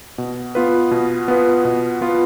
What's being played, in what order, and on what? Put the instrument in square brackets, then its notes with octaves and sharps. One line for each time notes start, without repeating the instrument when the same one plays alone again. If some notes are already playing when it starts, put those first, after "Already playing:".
[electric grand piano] B2
B3 F4 B4
B2
B3 F4 B4
B2
B3 F4 B4